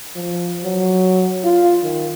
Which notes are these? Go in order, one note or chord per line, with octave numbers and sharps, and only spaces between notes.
F3
F#3
F4
D#3